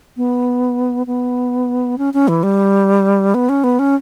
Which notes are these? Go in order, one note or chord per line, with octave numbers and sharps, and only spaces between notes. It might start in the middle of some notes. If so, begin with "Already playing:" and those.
B3
B3
C#4
C#4
E3
G3
B3
C#4
B3
C#4